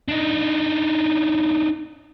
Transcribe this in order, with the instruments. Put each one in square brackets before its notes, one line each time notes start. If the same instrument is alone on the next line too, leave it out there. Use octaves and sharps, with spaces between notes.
[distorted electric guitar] D4 D#4